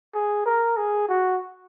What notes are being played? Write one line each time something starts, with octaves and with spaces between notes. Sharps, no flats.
G#4
A#4
G#4
F#4